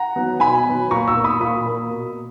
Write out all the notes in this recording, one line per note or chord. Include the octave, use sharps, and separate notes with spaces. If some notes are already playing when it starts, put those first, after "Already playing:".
Already playing: F#5 A#5
F#3 B3
B2 G#5 B5
F#3 B3
A#2 A#5 C#6
C#6 E6
A#3
B5 D#6
A#2 B5 D#6
A#3
B2